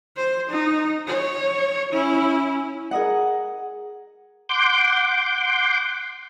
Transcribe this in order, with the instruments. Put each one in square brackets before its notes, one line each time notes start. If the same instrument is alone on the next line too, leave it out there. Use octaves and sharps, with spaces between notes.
[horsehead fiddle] C5
D#4
C#5
C#4 E4
[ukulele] G#4 A#4 D#5 F#5
[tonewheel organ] F#5 C6 D6 G6